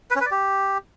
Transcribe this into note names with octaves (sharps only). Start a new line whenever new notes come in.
B4
C#4
B4
D5
G4